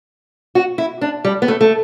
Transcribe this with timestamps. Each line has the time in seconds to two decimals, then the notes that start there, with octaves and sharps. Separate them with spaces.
0.55 F#4
0.78 E4
1.01 D4
1.25 G3
1.42 B3
1.48 A3
1.61 A3